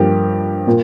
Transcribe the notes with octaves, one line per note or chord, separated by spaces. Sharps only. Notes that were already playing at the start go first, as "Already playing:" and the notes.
Already playing: G2 F3 A#3 G4
A#2 A#3